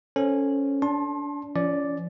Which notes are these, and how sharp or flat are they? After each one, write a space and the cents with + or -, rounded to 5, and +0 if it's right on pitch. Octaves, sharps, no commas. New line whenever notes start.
C#4 +0 A4 +15 C5 +0
D4 -30 A5 +0 C6 +30
F3 -30 C#4 +25 D5 +0